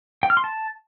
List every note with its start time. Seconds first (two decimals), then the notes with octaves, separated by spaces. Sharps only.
0.23 G5
0.30 F6
0.37 C6
0.44 A5